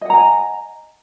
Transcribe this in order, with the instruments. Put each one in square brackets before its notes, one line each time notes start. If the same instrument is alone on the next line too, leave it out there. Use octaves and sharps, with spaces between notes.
[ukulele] D#5
F#5
A#5
G#5